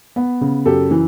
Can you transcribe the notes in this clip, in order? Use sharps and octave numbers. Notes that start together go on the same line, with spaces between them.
B3
C#3
F#2 G4 A4
E3